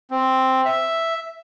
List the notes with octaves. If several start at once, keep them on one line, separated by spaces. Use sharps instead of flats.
C4
E5